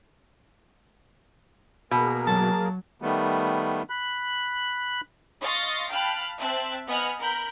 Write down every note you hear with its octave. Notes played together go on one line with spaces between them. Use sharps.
B2 A#3 G#4 A#4
F#3 A5
D#3 G3 A3 B3
B5 F#6
D#5 F5 C6 C#6 A6 A#6
F5 G5 A5 B5 F6 F#6
C4 E5 A5 F#6
B3 D#5 F#5 G#5 B5 F6
A#4 B5 G6